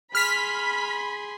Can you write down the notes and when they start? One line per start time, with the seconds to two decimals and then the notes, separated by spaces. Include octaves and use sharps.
0.15 G#4 B5 C6 F6 B6